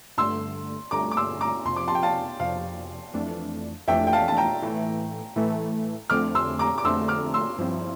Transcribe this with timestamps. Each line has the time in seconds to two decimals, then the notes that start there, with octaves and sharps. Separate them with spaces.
0.17 G2 D3 A3 C6 E6
0.91 G2 D3 A3 A#5 D6
1.11 D6
1.17 C6 E6
1.41 A#5 D6
1.65 F2 C3 F3 C6
1.76 D6
1.88 A5 C6
1.95 G5
2.03 F5 A5
2.39 F2 C3 F3 F5
3.14 F2 E3 A3 D4
3.88 F2 E3 A3 D4 E5 G5
4.07 G5
4.13 F5 A5
4.28 A5
4.37 G5 A#5
4.62 A2 E3 A3
5.36 A2 E3 A3
6.10 F2 D3 A3 C4 D6 F6
6.35 C6 E6
6.59 A#5 D6
6.78 D6
6.84 F2 D3 A3 C4 C6 E6
7.08 D6 F6
7.34 C6 E6
7.58 G2 F3 C4 E4